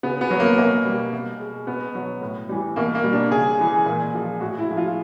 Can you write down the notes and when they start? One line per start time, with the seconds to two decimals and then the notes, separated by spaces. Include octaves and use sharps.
0.03 C#3 B3
0.21 B3
0.31 F#3
0.40 A#3
0.58 B2 A#3
0.85 G3
1.13 B2
1.40 G#3
1.67 B2 B3
1.95 F#3
2.21 A2
2.49 E3 G3
2.76 B2 A#3
2.95 A#3
3.04 G3
3.13 D4
3.31 C#3 G#4
3.59 E3 G#3
3.86 A#2
4.14 F3 G#3
4.40 A2 F#4
4.59 E4
4.68 F3 G#3
4.77 F4